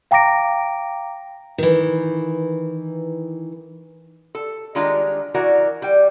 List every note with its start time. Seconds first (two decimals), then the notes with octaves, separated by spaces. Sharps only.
0.11 F5 G5 A#5 D6 A#6 D7
1.58 D#3 E3
4.35 A4
4.75 D#3 G3 G#3 D4 F4 A#5
5.34 E3 F#4 A#4 D5 A#5
5.82 G3 G5